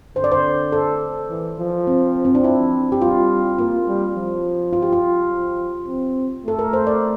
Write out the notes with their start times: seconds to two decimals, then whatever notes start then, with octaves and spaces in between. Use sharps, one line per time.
0.16 D3 C5
0.24 D5
0.32 C5
0.72 A4
1.30 E3
1.59 F3
1.87 C4
2.25 C4
2.35 D4
2.44 E4
2.92 G4
3.02 G3 F4
3.59 A#3 F4
3.88 G3
4.16 F3
4.73 F4
4.83 G4
4.93 F4
5.30 F3
5.87 C4
6.44 A3 A4
6.59 A#4
6.73 C5
6.87 D5